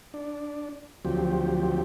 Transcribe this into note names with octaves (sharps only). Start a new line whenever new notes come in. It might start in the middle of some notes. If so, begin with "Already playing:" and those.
D4
D2 F3 F#3 C4 G4